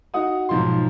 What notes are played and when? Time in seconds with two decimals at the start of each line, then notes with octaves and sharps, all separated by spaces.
0.14 D#4 F#4 F#5 D#6
0.49 B1 G#2 F3 F4 C6